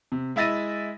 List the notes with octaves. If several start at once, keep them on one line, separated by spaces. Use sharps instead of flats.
C3
G#3 E4 E5 A6 A#6 D#7